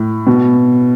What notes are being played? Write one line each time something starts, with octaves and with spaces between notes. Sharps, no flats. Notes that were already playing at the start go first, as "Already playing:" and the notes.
Already playing: A2
B2